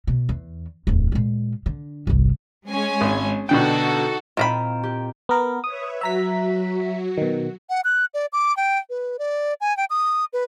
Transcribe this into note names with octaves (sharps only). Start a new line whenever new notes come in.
B2
E2
D1 E2
A#2 G#3
D3
G1 C2
G#3 C#4 G#5
G#1
B2 D3 D#4 F#4 A4 G5
A#2 D#3 C4 F4 A#5 B5
G4
B3 A#4
B4 C#5 E5 D#6
F#3 F#4 E5 A#5 B6
B2 D#3
F#5
F#6
D5
D6
G5
B4
D5
G#5
G5
D#6
B4